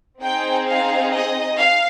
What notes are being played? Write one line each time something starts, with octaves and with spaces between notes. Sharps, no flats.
C4 D#4 G#4 G5
F5
D#5
F5